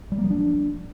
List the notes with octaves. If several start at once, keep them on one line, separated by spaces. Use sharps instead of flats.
G3
A#3
F3
D4